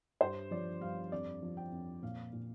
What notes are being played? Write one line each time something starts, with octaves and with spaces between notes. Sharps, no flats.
G2 C5
F3 D5
G2 F5
F2 D5
F3
G5
F2
A#2 F5
A#2